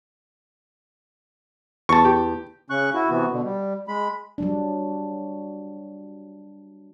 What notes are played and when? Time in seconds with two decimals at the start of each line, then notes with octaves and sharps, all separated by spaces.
1.89 E2 A5 C#6
2.05 G4
2.70 C#3 C#4 C#6 F#6
2.95 E4 F#4
3.10 C3 E3 B3 F#4
3.31 B2 D3
3.44 G3
3.88 G#3 B5
4.38 F#3 G3 D4